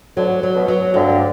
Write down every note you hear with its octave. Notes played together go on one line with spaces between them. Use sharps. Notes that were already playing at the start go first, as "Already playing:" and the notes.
D2 D3 F#3
F#3
B2
F#3
D2 G2 D3